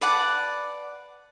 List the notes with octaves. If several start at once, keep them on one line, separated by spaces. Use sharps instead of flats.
B4 D5 F#5 A5